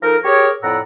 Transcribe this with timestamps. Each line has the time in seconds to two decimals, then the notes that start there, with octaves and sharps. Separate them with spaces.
0.02 F3 D#4 A4 A#4
0.24 G4 G#4 A#4 C#5
0.63 F2 A2 D5 F#5 A#5 E6